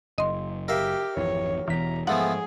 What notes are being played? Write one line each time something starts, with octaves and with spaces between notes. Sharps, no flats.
F#1 D#5 C6
G4 A#4 E5 F5
G#1 F2 E3 C#5
E1 E2 E3 A#5 B6
G#2 F3 A3 B3 G#4 F#5